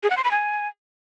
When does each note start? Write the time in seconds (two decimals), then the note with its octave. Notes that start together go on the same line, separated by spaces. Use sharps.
0.03 G#4
0.10 F#5
0.17 C6
0.24 B5
0.31 G#5